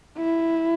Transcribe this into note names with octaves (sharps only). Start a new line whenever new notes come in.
E4